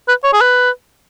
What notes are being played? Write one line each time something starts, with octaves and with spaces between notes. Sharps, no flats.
B4
C#5
G#4
B4